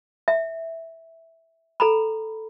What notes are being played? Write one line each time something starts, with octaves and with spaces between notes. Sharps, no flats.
E5
A4 A#5 B5